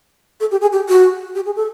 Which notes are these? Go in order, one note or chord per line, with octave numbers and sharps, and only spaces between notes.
A4
G4
G#4
G4
F#4
G4
G#4
A4